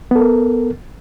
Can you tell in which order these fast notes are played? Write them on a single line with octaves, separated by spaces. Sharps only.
B3 A4 A#4